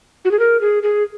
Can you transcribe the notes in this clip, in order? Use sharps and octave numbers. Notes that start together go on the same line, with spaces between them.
F#4
G#4
A#4
G#4
G#4